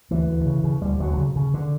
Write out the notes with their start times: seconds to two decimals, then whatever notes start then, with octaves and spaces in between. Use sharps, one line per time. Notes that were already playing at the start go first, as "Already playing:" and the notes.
0.11 D2 E3
0.29 D2
0.46 C#3
0.64 C#3
0.82 D2 G3
1.00 D2 F#3
1.18 C#3
1.36 C#3
1.54 D3